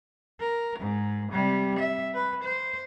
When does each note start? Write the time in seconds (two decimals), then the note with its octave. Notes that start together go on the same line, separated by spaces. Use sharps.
0.40 A#4
0.79 G#2
1.32 C3 G3
1.79 E5
2.15 B4
2.44 C5